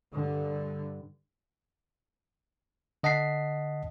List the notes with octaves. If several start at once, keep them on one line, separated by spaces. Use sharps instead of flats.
G2 D3
D3 D#5 F#5 A5 B6 C7